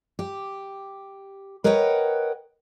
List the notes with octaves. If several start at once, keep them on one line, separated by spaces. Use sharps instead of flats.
G4
A#4 B4 C#5 D#5 F#5 G5